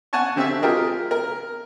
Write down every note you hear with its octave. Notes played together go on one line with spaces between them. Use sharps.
F#5 G#5 A5 C#6
D3 C4 G4 E5 E6
G#3 F4 G4 A#4 D#5
A#4